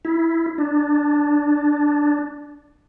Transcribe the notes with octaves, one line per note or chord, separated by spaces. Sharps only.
E4
D4